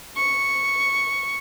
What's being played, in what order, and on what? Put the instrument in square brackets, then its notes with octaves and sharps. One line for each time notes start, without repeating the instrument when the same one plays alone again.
[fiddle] C#6